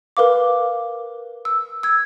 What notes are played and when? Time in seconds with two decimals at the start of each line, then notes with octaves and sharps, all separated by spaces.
0.17 A#4 B4 F5 D6
1.45 E6
1.83 E6 G#6